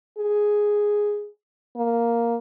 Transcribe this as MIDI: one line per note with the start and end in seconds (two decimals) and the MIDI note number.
0.18 1.29 68
1.77 2.36 58